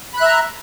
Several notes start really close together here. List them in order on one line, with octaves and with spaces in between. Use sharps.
B5 F#6 E5 A#5